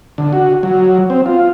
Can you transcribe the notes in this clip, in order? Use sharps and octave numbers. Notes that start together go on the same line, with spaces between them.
D3
F#4
F#3
C4
F4